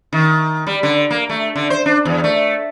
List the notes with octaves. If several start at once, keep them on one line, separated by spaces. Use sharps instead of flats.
D#3
G3
D3
A#3
A3
D3
C5
D4
E2
A3